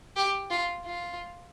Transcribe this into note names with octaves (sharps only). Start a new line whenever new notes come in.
G4
F4
F4